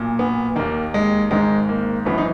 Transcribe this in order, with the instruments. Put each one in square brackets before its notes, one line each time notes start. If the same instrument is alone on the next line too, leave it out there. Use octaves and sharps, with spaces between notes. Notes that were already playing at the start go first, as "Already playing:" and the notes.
Already playing: [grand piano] B1 A#2
B3
D#2 D#3 A#3
G#3
G#1 G#2 D#3 G#3
A#3
G#1 F#2 E3 B3
D#4